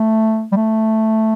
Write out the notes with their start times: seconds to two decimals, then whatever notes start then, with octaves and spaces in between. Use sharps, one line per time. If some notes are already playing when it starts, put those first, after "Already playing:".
Already playing: A3
0.52 G3
0.56 A3